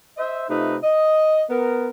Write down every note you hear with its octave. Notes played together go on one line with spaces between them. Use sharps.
C5 D#5 E5
C3 A3 D#4 F4 B4
D#5
B3 A#4